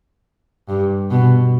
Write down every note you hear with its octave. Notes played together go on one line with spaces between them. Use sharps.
G2
B2